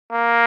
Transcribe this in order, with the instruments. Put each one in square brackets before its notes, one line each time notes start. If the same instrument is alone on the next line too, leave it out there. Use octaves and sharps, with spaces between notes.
[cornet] A#3